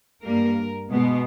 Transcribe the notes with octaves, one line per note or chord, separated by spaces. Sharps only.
G2 G3 A#3 A#4
B2 G#3 B3